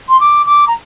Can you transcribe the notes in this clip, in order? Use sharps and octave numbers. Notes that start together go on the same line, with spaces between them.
C6
D6
D6
A#5